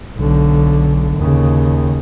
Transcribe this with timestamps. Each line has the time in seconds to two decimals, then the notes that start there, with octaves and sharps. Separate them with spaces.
0.17 B1 D3
1.17 D#2 C#3